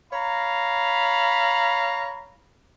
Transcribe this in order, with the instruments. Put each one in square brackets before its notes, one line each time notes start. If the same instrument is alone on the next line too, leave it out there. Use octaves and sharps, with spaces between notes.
[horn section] C#5 F5 A#5 B5